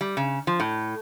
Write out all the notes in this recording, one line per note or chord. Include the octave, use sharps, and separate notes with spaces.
G3
C#3
F3
A2